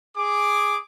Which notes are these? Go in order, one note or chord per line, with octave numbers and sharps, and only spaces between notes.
G#4 D6